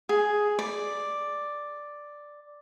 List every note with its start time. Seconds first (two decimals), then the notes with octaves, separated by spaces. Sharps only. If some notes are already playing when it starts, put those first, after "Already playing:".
0.09 G#4
0.59 D5